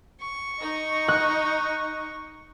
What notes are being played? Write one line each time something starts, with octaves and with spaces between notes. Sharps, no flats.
C#6
D#4 D#5
F#6